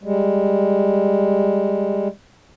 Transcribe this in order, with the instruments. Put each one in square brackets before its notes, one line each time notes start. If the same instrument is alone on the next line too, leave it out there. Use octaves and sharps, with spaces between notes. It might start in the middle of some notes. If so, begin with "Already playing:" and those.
[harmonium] G3 G#3